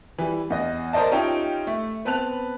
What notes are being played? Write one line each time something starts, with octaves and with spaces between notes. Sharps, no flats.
E3 G3
E2 D#5 A#6
A#4 C5 D5 D#5 A5
C#4 D#4 F4 G4 E5 G5
A3
B3 C4 B4 A5 F#6 F7